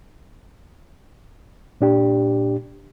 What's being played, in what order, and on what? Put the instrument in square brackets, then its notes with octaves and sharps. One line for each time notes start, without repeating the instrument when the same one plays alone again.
[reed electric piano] A#2 D4 G4